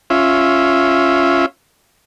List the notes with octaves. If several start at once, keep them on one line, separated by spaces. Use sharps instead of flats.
C#4 F4 E5